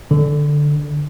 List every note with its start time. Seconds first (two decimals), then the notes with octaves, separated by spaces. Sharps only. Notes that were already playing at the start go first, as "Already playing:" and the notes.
0.11 D3